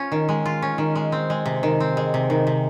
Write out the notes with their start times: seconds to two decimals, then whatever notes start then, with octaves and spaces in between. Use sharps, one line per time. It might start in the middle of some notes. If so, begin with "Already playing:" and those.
Already playing: C#4 F4
0.12 D#3
0.29 G#3
0.46 F4
0.62 C#4
0.78 D#3
0.96 G#3
1.12 C4
1.30 G#3
1.46 C3
1.63 D#3
1.80 C4
1.97 G#3
2.14 C3
2.30 D#3
2.47 C3